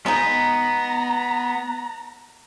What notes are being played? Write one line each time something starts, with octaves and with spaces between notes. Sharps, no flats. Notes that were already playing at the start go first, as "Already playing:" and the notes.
G#3 B3 D#4 A#5